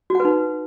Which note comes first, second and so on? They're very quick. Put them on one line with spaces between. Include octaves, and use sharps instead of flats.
F#4 F#5 B4 D#4